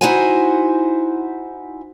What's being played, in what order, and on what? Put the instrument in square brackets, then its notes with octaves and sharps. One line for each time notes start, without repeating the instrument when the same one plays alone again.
[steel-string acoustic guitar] D#4 E4 F#4 C5 F#5 G#5